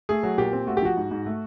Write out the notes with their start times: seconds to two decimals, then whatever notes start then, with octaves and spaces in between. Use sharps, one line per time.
0.09 A3 G#4
0.23 F#3
0.38 A#2 G4
0.53 C4
0.67 A3 F#4
0.77 G4
0.82 F3 F#4
0.97 G#2
1.11 G#2
1.26 A3